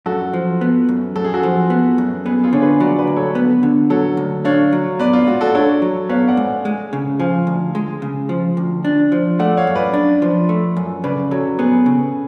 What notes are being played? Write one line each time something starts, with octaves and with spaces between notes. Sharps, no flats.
F#2 F#4 A4
F3
B3
F#2
F#2 A4
G#4
F#4 A4
F3
B3
F#2
B3 G#4 B4
F4 G#4
D3 C#5
G#4 B4
F#3 B4 D5
B4 D5
D2
A4 C#5
B3
D3
F#3 A4 C#5
D2
D4 C#5 F5
F#3
B3 B4 D5
F4
G#2 F#4
F#4 A4
D4 A4 C#5
F#3
B3 C#5 F5
D5 F#5
G#2
G#3
C#3
F3 F5 G#5
D2
G#3
C#3
F3
D2
D4
F3
A3 D5 F#5
C#5 F5
F#2
B4 D5
D4
F3
A3
F#2
C#3 B4 D5
F#3 A4 C#5
B3 G#4 B4
C#3